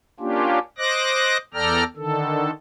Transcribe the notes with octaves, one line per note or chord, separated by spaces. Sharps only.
A#3 C#4 D4 F4 G4
C5 D#5 D6 F#6 A#6
E2 A4 D5 G5 A#5 F6
D3 D#3 A4